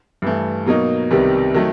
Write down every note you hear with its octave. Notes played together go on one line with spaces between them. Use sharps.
G2 E3 A3
B2 F#3 A#3 D#4
C2 C3 D#3 G3 B3
D#3 F#3 A3